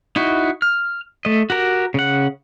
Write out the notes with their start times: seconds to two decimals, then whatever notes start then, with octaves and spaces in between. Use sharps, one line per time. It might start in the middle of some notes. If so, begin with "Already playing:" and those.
0.16 D#4 E4 F#4
0.62 F6
1.25 A3 D#5
1.50 F#4 G4 A#4
1.94 C#3 F#5